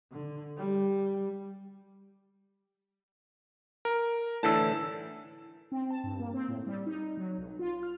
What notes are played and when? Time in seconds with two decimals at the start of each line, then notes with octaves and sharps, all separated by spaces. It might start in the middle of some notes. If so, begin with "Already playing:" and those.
0.12 D3
0.58 G3
3.85 A#4
4.43 A2 D3 E3 A5 E6
5.72 C4
5.91 A5
6.03 G2
6.20 A#3
6.34 C4
6.48 A2
6.66 G3
6.86 D#4
7.17 F#3
7.37 B1
7.59 F4
7.83 F6